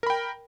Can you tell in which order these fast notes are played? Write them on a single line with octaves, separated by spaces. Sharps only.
A#4 B5 G5